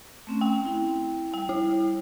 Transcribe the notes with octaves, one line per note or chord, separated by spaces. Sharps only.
A3 C4 C#4
G5
E4
G3 G5
E4